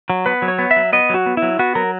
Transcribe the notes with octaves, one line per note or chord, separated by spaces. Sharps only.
F#3
B3 B4
F#3
C#5
B3
E5
F#3
B3 D#5
F#3 F#4
B3
E4
F#3
B3 F#4
F#3 A#4